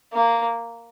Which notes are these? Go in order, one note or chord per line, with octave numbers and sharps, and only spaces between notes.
A#3